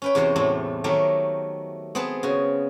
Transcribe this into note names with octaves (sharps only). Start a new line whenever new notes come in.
C#4 B4 G5
E2 C3 F#4 C5 C6
A2 G3 A3 C4
D#3 F#3 A3 G4 A#4
B3 C4 G#4 B4 A5
C#3 F#4 G#5